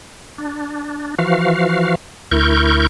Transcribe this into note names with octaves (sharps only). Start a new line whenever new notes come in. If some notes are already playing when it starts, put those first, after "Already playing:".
D4
E3 F3 F#4 F5
D2 E4 A#4 C#6 G6